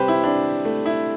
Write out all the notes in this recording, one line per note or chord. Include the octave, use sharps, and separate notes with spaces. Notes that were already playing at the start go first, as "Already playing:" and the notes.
Already playing: C3 G3 G4 B4 C5
E4
D4
A3
E4